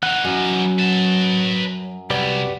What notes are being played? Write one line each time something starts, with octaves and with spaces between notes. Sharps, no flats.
E3 D#4 F#5
F#2
F#3
B4 A5
C2 G4 B4 D5 F#5